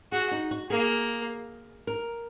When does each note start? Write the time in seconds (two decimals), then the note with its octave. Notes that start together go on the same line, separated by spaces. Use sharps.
0.12 F#4 G#4
0.31 D#4
0.51 F#4
0.70 A#3 G#4
1.87 A#4